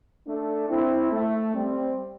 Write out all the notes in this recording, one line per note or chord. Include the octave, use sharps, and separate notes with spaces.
A3 D4
C4 E4
A3
G3 C4